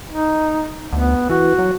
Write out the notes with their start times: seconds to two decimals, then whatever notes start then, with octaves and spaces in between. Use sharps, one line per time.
0.11 D#4
0.93 D2 B3
1.29 E3 F#4
1.58 F#3